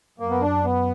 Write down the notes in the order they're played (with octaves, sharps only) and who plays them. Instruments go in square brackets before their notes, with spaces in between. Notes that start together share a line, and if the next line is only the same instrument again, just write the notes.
[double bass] F#2 [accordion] A#3
[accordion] B3
D4
B3